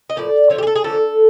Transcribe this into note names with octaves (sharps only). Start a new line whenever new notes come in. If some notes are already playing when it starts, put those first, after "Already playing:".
D#5
A2 F3 A#3 D5
D3 F3 A3 C#5
G4
G#4
A4
G#4
D3 F3 A#3 C#4 A4